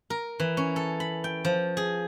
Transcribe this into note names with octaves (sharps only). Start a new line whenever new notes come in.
A#4
E3
C#4
A4
B5
G5
F3
G#4